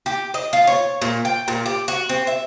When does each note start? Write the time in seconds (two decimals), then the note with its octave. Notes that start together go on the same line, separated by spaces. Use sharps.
0.06 G4
0.34 D#5
0.53 F4
0.67 C#5
1.02 A#2
1.25 G5
1.48 A#2
1.66 G4
1.88 F#4
2.09 C4
2.27 E5